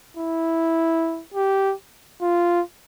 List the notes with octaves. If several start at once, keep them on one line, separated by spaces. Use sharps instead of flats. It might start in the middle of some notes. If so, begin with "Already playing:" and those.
E4
G4
F4